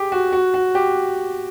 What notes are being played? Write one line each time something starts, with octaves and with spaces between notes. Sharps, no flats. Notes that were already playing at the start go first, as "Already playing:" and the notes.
Already playing: G4 G#4
F#4
F#4
F#4
G4